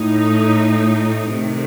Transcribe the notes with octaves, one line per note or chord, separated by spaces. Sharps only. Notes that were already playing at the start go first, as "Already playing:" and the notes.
Already playing: A2 A3 D#4
C3 D#3 A3